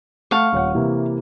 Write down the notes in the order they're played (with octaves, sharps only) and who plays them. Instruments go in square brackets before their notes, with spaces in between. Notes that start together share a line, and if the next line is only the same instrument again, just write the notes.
[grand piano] A3 F#5 A5 [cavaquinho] F5 C#6
[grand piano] D#1 C#4 F#5
C3 E3 A#3